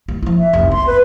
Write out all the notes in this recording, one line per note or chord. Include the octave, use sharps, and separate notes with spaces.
D#2 G3
F3 E4
E5
F1 C2
B3 C6
B4